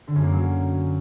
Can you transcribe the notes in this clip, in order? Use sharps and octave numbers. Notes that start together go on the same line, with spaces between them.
D3
F#2
A#3
F#3